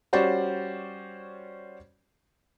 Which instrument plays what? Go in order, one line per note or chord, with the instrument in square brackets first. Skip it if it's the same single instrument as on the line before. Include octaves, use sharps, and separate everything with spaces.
[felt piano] G3 C#4 F#4 C5 D5